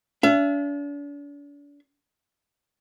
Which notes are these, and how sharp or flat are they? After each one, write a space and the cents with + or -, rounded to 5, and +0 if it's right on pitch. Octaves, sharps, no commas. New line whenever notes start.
D4 -40 E5 +40